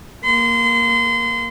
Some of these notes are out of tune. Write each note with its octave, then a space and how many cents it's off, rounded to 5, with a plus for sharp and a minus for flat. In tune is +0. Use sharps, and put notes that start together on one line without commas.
A#3 +0 C6 -30